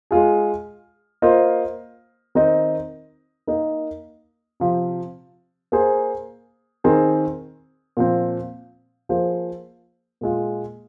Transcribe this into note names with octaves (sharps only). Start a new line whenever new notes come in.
G#3 F4 G#4
A#3 F4 C5 D#5
D#3 C4 D#4 A#4 D#5
A#3 D#4 A#4 D#5
C3 F3 C4
A#3 G#4 C5
D#3 C4 G#4
A#2 F3 C4
F3 A#3 G#4 C5
A#2 G#3 F4